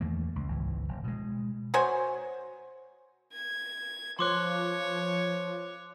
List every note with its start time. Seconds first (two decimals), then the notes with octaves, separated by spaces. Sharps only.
0.01 E2 D#3 A3 A#3
0.36 C#2
0.48 G#1 C#2 E3
0.88 F1
1.04 B2 G#3
1.74 F#4 C5 C#5 G#5
3.32 G#6
4.19 F3 C#5 C6 D6 F#6